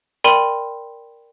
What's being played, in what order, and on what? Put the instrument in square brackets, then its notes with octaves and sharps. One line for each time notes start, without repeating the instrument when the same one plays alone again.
[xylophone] A#4 D5 G5 B5 C6 D#7